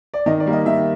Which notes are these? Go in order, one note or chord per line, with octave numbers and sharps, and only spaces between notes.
D5
D#3 D#5
D5
G3 A#3
D#5
D#3 E5